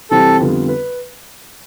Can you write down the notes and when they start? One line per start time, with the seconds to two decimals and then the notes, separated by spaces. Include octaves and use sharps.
0.11 C3 E3 G3 C4 G4 A4
0.40 F2 D3 G3 B3 F4
0.68 B4